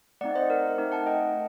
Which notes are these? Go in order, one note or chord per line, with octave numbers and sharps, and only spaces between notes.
A3 C4 D#4 D5 F#5
C5 D#5
A#4
A3 C4 D#4 A#4
F#5 A5
D#5 G5